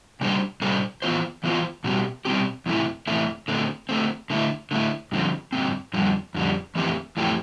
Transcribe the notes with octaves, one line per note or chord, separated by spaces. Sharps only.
C3 G3 D4 A4 C5
C3 G3 D4 A4 C5
E3 B3 F4 C5
E3 B3 F4 C5
B2 G3 C4 G4
B2 G3 C4 G4
E2 C3 E3 A3 E4
E2 C3 E3 A3 E4
D3 A3 C4
D3 A3 C4
D3 A3 E4
D3 A3 E4
G2 D3 F3 C4
G2 D3 F3 C4
F2 D3 G3
F2 D3 G3
F2 E3 A3 C4 G4
F2 E3 A3 C4 G4